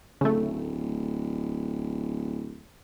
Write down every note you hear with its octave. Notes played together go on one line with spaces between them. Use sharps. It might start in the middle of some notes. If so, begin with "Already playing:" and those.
D1 C#3 A3